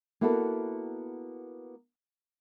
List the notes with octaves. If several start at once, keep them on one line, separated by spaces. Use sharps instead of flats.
A#3 B3 E4 F#4 A4